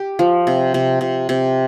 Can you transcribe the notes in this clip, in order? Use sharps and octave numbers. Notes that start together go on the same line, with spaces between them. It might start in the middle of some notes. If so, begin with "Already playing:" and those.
Already playing: G4
F3
C3
C3
C3
C3